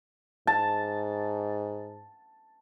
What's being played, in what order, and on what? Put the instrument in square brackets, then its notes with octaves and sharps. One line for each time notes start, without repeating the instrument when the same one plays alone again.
[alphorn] G#2 [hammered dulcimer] A5